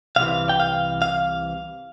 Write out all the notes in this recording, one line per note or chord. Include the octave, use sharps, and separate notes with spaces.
C2 C3 E3 F5
G5
F5
F5